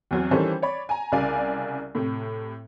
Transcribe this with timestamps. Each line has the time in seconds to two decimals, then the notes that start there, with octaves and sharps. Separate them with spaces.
0.11 E2 F#3 C4
0.31 D#3 E3 G3 C#4 A4 C5
0.62 C#5 D5 B5
0.89 G#5 A#5
1.12 C2 C#3 D5 F5 G#5
1.95 A2 C3